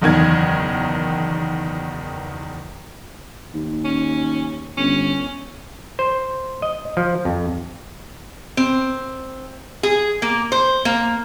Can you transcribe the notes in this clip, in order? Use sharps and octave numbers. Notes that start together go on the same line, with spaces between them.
F#1 E2 D#3 G#6
D#2
C#4
G1 C#4
C5
D#5
F3
F2
C4
G#4
A#3
C5
A#3